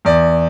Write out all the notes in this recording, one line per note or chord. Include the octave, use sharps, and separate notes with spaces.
E2 D5